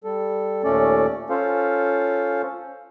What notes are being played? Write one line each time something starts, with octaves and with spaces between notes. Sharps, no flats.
G3 A4
D#2 A#2 A3 C#4 A4 D5
C#4 F4 A4 C5 F5